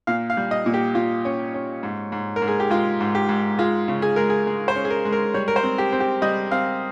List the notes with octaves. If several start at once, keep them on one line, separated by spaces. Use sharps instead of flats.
A#2 F5
F5
G3
D#5
A#2
G4
A#2 F4
C#4
C#4
G#2
G#2
A#4
G#2
G#4
G4
G#3 F4
G#2
G4
G#2
G#3 F4
C#3
G#4
G#3 A#4
G#4
G#3
C5
C#4
G#4
A#4
G#3
A#4
G3 C#5
A#4
C5
C4
G4
C4
G4
G3 D#5
C4 F5